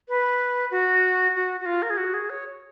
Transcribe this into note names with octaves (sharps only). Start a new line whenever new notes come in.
B4
F#4
F#4
F#4
F4
A#4
G#4
F#4
G#4
C#5